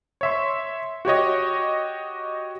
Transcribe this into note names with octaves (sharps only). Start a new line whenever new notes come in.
C#5 E5 C6
F#4 G4 C#5 D#5